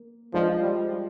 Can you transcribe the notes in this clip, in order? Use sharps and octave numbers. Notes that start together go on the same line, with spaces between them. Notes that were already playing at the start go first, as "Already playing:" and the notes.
Already playing: A#3
F3 G#3 D4 F4 C5 D#5
G3